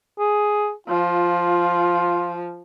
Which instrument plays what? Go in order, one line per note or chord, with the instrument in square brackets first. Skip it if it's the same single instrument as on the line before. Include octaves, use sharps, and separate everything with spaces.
[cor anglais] G#4
[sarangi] F3 [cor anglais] F4